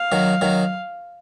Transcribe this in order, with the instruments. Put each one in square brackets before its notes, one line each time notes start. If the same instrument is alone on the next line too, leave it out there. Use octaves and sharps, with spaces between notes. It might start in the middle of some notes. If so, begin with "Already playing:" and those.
Already playing: [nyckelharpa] F5
[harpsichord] D#3 F#3
D#3 F#3